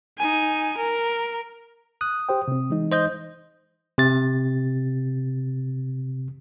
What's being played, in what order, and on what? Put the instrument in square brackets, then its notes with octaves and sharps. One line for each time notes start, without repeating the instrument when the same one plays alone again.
[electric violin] D#4 G#5
A#4
[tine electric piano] D#6 [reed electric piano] F#6
[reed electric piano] G4 C5 G5
C3 C4
E3 G#3 D#4
[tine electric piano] C5 D#5 G6
C3 A6